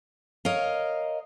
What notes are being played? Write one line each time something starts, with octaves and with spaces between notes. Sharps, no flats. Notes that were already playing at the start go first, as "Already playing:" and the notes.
A#4 C#5 D#5 F5